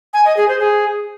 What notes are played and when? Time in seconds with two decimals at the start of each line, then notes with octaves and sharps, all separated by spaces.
0.13 G#5
0.25 D#5
0.37 G#4
0.48 C5
0.60 G#4